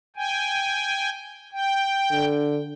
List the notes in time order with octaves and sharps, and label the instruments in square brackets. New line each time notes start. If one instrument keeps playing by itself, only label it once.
[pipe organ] G5 G#5
G5
[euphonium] D3